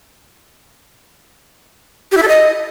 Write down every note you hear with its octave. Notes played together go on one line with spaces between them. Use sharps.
G4
E4
A4
D#5